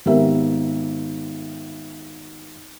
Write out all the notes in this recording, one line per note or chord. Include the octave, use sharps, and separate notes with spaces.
G#1 B3 G4 A#4 E5